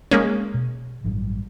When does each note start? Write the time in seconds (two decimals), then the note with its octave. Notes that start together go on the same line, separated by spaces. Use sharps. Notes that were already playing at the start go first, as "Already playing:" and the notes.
0.11 G#3 A#3 C#4
0.54 B2
1.04 A1 G2 F#3